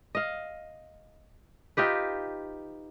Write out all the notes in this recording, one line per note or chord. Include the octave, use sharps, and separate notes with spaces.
D#5 F5
D#4 F4 G4 B4